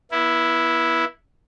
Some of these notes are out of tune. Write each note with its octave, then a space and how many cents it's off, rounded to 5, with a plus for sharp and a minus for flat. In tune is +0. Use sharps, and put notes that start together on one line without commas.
B3 -35 E4 +0